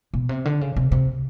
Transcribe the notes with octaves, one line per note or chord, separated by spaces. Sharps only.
B2
C3
D3
C#3
C3
C3